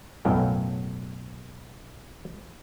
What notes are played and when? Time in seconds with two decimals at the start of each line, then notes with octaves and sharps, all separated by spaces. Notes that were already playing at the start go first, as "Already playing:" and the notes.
0.25 B1 F#2 A2 F#3 F5 G5